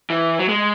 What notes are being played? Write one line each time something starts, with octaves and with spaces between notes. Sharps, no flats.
E3
F#3
G#3